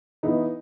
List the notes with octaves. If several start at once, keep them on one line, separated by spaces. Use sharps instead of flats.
E3 B3 D#4